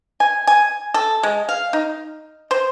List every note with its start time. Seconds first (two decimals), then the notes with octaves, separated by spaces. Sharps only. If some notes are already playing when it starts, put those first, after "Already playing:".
0.20 G#5
0.47 G#5
0.94 A4
1.23 G#3
1.49 F5
1.73 D#4
2.51 C5